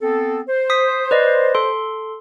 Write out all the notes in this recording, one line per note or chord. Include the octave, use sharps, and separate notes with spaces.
B3 C4 A4
C5
D#6 B6
B4 D5 D#5
A4 C6